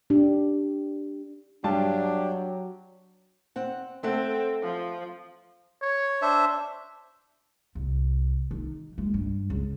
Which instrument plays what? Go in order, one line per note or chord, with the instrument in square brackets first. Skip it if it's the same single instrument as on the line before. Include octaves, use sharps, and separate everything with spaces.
[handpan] D4 G4
[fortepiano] G2 A5 [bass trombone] F#3 [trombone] D4 [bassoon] G4
[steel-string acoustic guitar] C4 F#5
[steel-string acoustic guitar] A3 A4 F#5 [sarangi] C4
[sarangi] F3
[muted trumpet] C#5
[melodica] D4 C5 E5
[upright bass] C2
D#3
G#3
G2
C#2